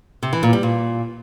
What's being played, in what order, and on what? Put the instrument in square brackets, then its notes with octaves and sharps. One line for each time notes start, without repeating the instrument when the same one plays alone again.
[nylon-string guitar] C3
E3
A#2
G3
A#2